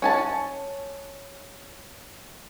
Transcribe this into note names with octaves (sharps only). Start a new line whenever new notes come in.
C#4 G#5 A5